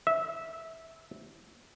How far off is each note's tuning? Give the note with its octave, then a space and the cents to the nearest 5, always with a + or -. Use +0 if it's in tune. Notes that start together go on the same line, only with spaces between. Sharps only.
E5 -15